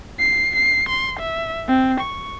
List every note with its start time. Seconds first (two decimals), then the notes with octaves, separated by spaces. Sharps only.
0.19 C7
0.56 C7
0.89 C6
1.20 E5
1.68 C4
2.00 C#6